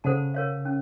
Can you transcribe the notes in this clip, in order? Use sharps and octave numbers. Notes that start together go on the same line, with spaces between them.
C#3 A4 C5 F#5 A5
A#4 C#5 F5
C#4